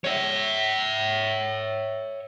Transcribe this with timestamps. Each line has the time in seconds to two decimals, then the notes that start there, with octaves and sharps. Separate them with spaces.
0.04 C#5 E5